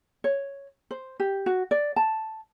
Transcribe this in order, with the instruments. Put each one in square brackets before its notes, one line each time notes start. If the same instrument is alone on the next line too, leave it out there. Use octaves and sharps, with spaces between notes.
[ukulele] C#5
C5
G4
F#4
D5
A5